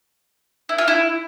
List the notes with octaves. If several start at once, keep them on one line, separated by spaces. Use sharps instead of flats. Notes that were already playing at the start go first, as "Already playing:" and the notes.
E4
F4
E4